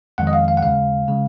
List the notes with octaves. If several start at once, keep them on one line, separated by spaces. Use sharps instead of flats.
F2 D#3 G#3 F#5
D#5
F5
F5
F#5
D#2 C#3 G#3 F5
C#3 G#3